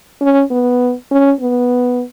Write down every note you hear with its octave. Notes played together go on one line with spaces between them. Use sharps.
C#4
B3
C#4
B3